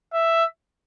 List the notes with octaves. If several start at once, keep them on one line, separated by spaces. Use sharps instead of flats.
E5